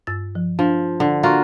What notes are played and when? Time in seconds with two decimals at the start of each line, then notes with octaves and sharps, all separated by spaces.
0.07 G2 E6 A6
0.35 F3
0.59 F3 D4
1.00 D3
1.23 A#3 F4 F#4